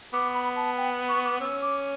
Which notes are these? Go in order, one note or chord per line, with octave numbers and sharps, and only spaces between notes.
B3 D6
B5
A5
G5
C#6
D6
C#4 E6
D6